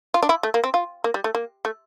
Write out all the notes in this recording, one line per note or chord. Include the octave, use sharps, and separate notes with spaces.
F4
D4
E4
A3
A#3
C4
F4
A#3
G3
A3
A#3
A3